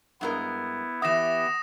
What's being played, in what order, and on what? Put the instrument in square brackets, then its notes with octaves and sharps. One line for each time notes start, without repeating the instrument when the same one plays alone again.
[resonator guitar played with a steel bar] G2 G#3 A#4 [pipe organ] B3 E4
[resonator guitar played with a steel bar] E3 E5 [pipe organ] B3 G4 [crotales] D#6 A#6 E7